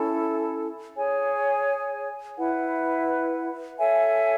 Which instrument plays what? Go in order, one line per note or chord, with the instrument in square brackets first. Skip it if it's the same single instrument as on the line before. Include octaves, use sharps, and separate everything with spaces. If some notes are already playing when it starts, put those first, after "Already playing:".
Already playing: [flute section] C#4 E4 A4
G#4 C#5 G#5
E4 B4 F#5
A4 C#5 E5 G#5